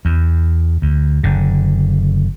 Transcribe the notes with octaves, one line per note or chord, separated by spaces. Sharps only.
E2
D2
F#1 D3